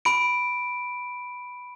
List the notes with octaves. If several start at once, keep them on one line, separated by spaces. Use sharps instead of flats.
B5 D7